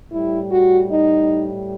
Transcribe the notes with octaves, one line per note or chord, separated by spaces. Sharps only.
A2 G3 E4
F#4
D#4